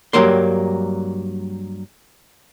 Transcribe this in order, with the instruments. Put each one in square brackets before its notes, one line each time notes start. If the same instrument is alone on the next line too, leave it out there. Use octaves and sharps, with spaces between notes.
[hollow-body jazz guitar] G2 F#3 G3 A#3 C6